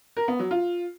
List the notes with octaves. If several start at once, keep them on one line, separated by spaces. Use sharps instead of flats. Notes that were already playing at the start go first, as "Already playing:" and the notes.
A#4
B3
F#3
F4